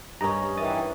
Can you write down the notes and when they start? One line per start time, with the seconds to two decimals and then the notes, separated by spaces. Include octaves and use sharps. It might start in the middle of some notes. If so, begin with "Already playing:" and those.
0.21 G2 C#4 A#4 D#5 A#5
0.57 D#3 E3 D#5 D#6 A6